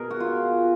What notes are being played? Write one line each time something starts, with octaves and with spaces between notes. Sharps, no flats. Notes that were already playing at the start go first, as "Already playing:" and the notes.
Already playing: B2 G#4 A#4
F#4
F4